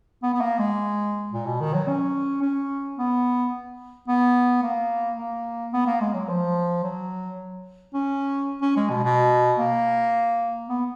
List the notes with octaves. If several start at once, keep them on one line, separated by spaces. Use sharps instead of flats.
B3
B3
A#3
G#3
A#2
B2
D#3
F#3
C#4
C#4
B3
B3
A#3
A#3
B3
A#3
G#3
F#3
F3
F#3
C#4
C#4
G#3
B2
B2
A#3
B3